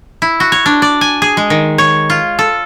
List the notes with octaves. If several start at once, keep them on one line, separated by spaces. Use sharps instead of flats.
E4
F#4
C#5
D4
D5
G#5
G#4
G#3
D#3
C#5
F4
A4